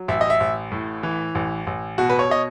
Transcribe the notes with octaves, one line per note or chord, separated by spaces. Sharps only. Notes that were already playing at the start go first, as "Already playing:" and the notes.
Already playing: F#3
A1 E5
D#5
E5
A1
A2
E3
A1
A1
B2 F#4
B4
C#5
B2 D#5